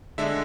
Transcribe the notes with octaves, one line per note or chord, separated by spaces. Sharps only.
D3 G#3 D4 E5